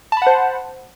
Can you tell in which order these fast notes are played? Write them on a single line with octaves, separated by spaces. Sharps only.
A5 B5 F#5 C5